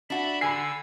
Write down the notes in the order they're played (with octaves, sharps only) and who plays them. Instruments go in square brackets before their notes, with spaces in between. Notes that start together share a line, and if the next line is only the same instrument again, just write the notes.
[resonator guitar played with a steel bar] D4 F#4 [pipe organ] E5 A5 B5
[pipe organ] D3 E6 [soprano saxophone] G#5 [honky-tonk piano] B5 C7